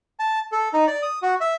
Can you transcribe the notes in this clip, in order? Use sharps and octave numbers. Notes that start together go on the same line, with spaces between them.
A5
A4
D#4
D5
D#6
F#4
E5